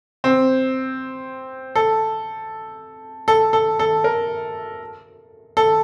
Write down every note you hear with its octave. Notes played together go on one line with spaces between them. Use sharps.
C4
A4
A4
A4
A4
A#4
A4